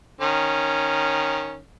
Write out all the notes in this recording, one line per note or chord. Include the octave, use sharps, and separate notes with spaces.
D#3 C#4